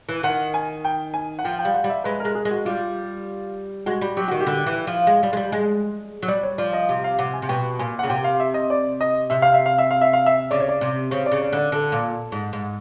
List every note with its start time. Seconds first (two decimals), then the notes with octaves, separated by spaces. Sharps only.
0.09 E3
0.23 D#3 F#5
0.54 G#5
0.85 G5
1.14 G#5
1.39 F#5
1.44 F3 G5
1.59 G5
1.65 G3
1.74 F#5
1.84 G3
1.90 E5
2.04 G#3 B4
2.20 G#3 A#4
2.35 G#4
2.45 G#3
2.51 F#4
2.65 G3 F4
3.86 G#3 F#4
4.01 G3
4.17 F#3 G4
4.28 D#3 F#4
4.41 G4
4.47 D3
4.66 E3
4.87 F3
5.07 G#3
5.23 G3
5.33 G#3
5.37 G3
5.52 G#3
6.22 F#3
6.28 G3 D5
6.43 C#5
6.58 F3 D5
6.73 D#5
6.89 C3
7.04 F5
7.19 C3 F#5
7.34 G#5
7.42 C3
7.49 B2 G5
7.79 A#2 G#5
7.99 C#3 F#5
8.09 C3 G5
8.24 F5
8.40 E5
8.54 D#5
8.70 D5
9.01 D#5
9.30 C3 E5
9.42 F5
9.54 E5
9.66 F5
9.78 E5
9.91 F5
10.01 E5
10.13 F5
10.26 E5
10.51 C#3 D5
10.60 C#5
10.68 D5
10.81 C3
11.11 C#3 C5
11.26 D5
11.32 C#3
11.41 D5
11.52 D3 D5
11.72 D3 A4
11.92 A#2
12.32 G#2
12.53 G#2